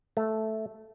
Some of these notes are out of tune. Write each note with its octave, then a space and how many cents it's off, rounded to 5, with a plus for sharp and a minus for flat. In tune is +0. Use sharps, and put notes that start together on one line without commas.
A3 -5